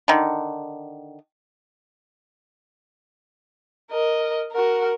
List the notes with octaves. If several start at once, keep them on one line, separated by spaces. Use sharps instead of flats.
D3 D#3
A#4 D#5
F#4 A#4